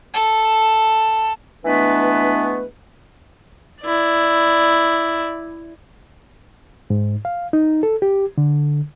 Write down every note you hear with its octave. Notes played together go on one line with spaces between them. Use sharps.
A4
E3 G#3 A3 B3 D4 B4
E4 D5
G#2
F5
D#4
A4
G4
D3